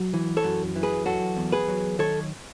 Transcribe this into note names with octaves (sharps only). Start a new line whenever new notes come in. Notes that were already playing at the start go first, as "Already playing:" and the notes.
Already playing: F#3
E3
A4 C#5
F#2
E3
G#4 B4
F#3 F#4 A4
E2
G#4 B4
F#3
D#3 A4 C#5